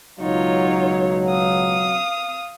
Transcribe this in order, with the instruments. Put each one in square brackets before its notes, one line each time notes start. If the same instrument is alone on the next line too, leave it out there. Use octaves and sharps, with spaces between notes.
[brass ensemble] C#2 B2 F#3 [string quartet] D#4 F4 C#5
[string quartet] F5 D#6